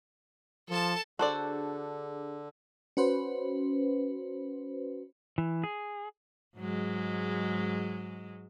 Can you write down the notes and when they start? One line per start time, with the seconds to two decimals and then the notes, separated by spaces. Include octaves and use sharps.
0.69 F3 A4 A5
1.19 D3 D4 F#4 G#4 A4 C5 D5
2.97 C#4 F#4 B4 C5
5.38 E3
5.64 G#4
6.57 G#2 F#3 G#3